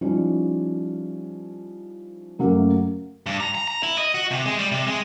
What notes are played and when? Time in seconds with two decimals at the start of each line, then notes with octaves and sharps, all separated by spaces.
0.01 F3 G3 C#4 D#4 E4
2.39 F#2 C#3 F#3 A3 A#3 C#4
3.26 G2
3.40 A#5
3.55 A#5
3.68 A#5
3.83 E4
3.98 D#5
4.15 F#4
4.31 C3
4.46 G#3
4.59 G3
4.72 C3
4.87 G#3